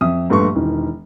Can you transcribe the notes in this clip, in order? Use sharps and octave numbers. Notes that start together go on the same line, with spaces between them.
F2 E5 D#6
A#1 G2 A3 B4 C6 C#6
E1 D#3 E3